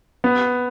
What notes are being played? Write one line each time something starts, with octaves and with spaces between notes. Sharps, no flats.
B3